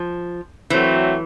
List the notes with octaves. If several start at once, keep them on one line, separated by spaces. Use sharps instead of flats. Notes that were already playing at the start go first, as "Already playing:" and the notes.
Already playing: F3
E3 F#3 A3 C4